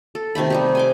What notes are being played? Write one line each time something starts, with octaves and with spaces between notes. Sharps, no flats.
A4
C3 D#3 A3 B5
G3 D#4 G4
G#5 C6 D6